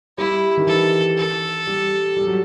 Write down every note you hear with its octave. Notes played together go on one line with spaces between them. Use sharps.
G3 E4
D#3
E3 A4
A4
G3
G3
F#3